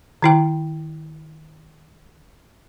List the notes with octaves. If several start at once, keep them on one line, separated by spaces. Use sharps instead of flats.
D#3 E4 G5